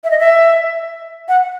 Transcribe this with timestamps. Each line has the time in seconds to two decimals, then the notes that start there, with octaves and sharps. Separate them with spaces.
0.04 E5
0.11 D#5
0.19 E5
1.28 F#5